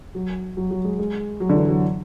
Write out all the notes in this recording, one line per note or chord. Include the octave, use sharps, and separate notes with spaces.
F#3
F#3
F#3
G#3
G#3
F#3
D3
E3
F#3